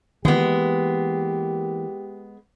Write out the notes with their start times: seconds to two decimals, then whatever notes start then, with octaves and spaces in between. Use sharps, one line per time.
0.25 D#3 E3 G#3 A#3 B3 F4 G4